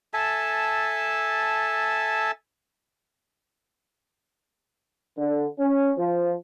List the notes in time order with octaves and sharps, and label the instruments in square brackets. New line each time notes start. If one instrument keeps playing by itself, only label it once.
[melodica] A4 E5 G#5 A5
[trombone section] D3
C#4
F3